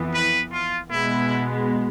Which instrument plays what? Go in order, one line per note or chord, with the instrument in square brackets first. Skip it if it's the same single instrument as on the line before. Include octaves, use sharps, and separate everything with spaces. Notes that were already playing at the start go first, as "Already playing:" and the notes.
Already playing: [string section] F2 E3 B3
[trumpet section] B4
F4
[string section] B2 G#3 B3 [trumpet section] E4